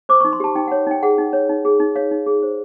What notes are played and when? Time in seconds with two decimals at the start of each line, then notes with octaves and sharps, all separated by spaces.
0.09 C5 D6
0.21 C#6
0.25 D#4
0.33 C6
0.40 G4 A5
0.55 D#4 G5
0.67 F#5
0.72 C#5
0.87 D#4 G5
1.03 G#4 F#5
1.18 D#4
1.33 C#5
1.49 D#4
1.65 G#4
1.80 D#4
1.96 C#5 F5
2.11 D#4
2.26 G#4
2.42 C5